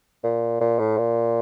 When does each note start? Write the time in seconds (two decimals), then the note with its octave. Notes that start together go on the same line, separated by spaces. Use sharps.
0.24 A#2
0.61 A#2
0.79 A2
0.98 A#2